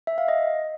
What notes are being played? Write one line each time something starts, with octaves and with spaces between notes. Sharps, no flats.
E5
F5
D#5